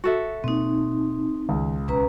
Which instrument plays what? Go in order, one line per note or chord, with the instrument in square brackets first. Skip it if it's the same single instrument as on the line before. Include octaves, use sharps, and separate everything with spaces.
[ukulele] F#4 A4 E5
[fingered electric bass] B2 A#3 [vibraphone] C4 D#4
[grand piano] C#2 [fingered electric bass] D#3
[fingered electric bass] B1 [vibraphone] C#4 B4 A#5